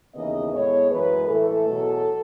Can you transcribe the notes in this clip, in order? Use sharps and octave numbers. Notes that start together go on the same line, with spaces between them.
D#2 C#3 E3 B3 D#5
A2 G#3 B3 C#5
F#2 E3 G#3 B4
A2 E3 A3 A4
E2 B2 F#3